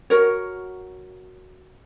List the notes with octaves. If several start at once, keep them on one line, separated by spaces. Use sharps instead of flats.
F#4 A#4 C#5